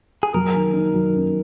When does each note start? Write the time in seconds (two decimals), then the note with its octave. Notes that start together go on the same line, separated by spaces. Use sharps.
0.23 G#4
0.34 F#3 A#4
0.54 D#3
0.74 D#3
0.94 F#3
1.13 C#4